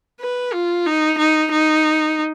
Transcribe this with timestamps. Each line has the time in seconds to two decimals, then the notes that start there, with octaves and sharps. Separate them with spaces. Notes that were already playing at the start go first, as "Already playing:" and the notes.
0.21 B4
0.53 F4
0.86 D#4
1.19 D#4
1.52 D#4